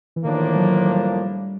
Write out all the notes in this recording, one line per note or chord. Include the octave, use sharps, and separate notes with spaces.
E3
A2 D#3 F3 A#3 D4
E3
F#3
G3